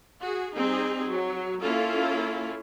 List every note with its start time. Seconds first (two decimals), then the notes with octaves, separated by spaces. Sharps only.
0.21 F#4 G#4
0.56 G3 C4 D#4 G#4
1.07 F#3
1.60 A#3 C#4 E4 F4 A4